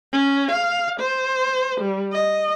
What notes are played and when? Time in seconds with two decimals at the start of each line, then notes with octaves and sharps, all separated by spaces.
0.13 C#4
0.51 F5
1.00 C5
1.81 G3
2.13 D#5